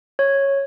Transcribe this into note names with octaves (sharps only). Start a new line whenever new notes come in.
C#5